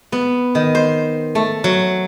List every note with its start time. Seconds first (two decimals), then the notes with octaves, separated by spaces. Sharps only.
0.12 B3
0.55 D#3
0.75 C5
1.35 A3
1.64 F#3